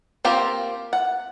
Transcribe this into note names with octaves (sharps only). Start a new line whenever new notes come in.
A#3 C4 F4 G4
F#5